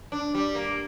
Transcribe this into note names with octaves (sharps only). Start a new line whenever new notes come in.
D4
G3
A#3